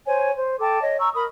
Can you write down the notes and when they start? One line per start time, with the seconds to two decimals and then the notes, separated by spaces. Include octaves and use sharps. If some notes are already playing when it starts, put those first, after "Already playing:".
0.06 C5 C#5 G#5
0.35 C5
0.60 A4 G5 A5 D6
0.81 C#5 D#5
0.99 A#5 C#6 E6
1.14 A#4 B5 D#6